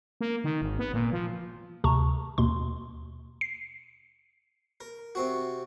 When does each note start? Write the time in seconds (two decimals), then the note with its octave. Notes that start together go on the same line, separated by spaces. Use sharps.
0.21 A#3
0.44 D#3
0.62 G#1
0.79 B3
0.94 A#2
1.13 F3
1.84 D2 C3 A5 A#5 C#6
2.38 D#2 B2 C6
3.41 C7
4.81 A#4
5.15 C3 C4 F#4